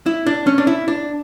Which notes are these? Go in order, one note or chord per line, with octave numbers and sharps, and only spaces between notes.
E4
D4
C#4
D4
E4
D4